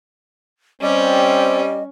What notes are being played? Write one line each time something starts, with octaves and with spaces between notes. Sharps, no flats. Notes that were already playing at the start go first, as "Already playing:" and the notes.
G3 C4 C#4 D#5